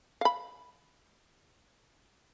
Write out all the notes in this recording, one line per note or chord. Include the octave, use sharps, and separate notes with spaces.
F5 B5